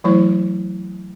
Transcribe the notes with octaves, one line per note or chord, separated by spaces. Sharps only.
E3 F#3 A3 E4 C5